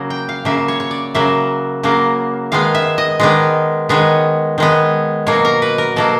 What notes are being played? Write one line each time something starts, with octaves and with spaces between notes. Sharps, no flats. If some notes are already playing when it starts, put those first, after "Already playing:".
Already playing: C#3 F#3 A#3
G5
F5
C#3 F#3 A#3 E5
C#5
C#5
D5
C#3 F#3 A#3 E5
C#3 F#3 A#3
D#3 G#3 B3 F5
E5
D#5
D#3 G#3 B3 D5
D#3 G#3 B3 C#5
D#3 G#3 B3
B2 F#3 A#3 C#5
A#4
B4
A#4
B2 F#3 A#3 A4